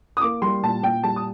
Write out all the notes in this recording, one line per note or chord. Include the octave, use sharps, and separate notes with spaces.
D#6
A#3 D6
G3 C6
A#2 A5
A#2 G5
G3 A5
D#6